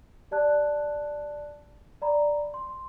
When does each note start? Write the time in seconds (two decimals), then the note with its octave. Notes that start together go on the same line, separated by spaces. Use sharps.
0.31 G4 D5 A5 F#6
2.02 D5 A#5 B5
2.54 C6